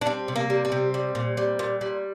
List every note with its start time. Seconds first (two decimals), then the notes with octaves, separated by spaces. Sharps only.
0.01 D4
0.06 G3 C4
0.28 C3
0.36 A#3
0.50 G3
0.65 C4
0.72 C3
0.94 G3
1.15 A#2
1.37 G3
1.59 A#2
1.81 G3